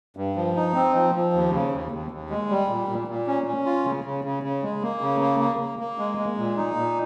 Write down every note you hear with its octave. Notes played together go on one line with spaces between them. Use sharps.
G2
F3
D#4
C4
F3
F3
D#2
C#3
D#2
D#2
D#2
G#3
G3
A#2
A#2
A#2
C#4
C#4
F4
C#3
C#3
C#3
C#3
G#3
A#3
C#3
A#3
A#3
A#3
A#3
G#3
G#3
A#2
D#4
A#2